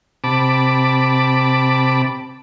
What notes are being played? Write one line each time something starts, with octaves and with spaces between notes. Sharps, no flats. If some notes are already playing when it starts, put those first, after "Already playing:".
C3 A5 B5 D6